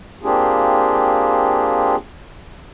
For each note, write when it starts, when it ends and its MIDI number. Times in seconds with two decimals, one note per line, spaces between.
0.23 1.95 58
0.23 1.95 60
0.23 1.95 62
0.23 1.95 65
0.23 1.95 67
0.23 1.95 68